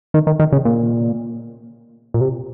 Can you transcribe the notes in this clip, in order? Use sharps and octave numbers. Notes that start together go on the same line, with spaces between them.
D#3
D#3
D#3
C#3
A#2
A#2
C3